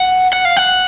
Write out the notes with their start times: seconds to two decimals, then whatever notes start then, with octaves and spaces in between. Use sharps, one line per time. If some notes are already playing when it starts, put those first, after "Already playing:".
Already playing: F#5
0.33 F#5
0.45 F5
0.57 F#5